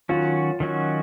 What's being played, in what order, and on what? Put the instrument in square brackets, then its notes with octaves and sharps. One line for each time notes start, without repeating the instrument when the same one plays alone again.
[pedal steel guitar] D#3 F#3 C#4 F#4 [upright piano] F4
[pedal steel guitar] D#3 F#3 C#4 F#4